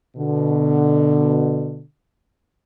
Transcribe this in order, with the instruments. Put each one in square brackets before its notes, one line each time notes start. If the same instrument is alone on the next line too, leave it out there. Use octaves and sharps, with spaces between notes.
[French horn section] B2 D3